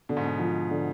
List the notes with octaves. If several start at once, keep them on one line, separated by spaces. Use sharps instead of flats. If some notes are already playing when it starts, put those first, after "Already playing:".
B2 D3
G#2
B2
F3
D3